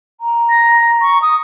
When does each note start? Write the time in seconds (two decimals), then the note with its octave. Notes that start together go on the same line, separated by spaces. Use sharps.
0.21 A#5
0.50 A#6
1.01 C#6
1.22 D#6